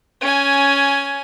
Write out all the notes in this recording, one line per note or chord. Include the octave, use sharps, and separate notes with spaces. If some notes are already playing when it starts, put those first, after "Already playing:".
C#4 G#5